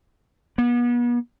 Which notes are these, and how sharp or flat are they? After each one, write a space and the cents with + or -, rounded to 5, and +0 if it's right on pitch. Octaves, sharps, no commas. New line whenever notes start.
B3 -40